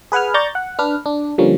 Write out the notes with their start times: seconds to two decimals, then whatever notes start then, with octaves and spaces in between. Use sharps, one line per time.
0.12 G#4 B4 F#5 G#5 F6
0.34 D5 A#5 C#6 G6 A6
0.55 F#5
0.79 D4 B4 F6
1.06 D4
1.38 D3 F3 G3 A#3 C#4